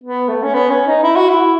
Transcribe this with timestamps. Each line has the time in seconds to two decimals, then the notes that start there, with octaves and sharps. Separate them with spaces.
0.04 B3
0.28 A3
0.43 C#4
0.54 B3
0.70 C#4
0.87 D#4
1.03 E4
1.16 F#4
1.29 E4